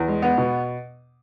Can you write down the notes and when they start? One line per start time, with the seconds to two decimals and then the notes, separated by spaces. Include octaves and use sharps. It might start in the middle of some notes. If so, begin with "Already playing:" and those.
Already playing: E2
0.08 G#3
0.22 B3
0.38 B2